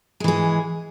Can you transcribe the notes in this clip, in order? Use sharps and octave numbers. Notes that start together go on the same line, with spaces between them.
E3 G#3 G#4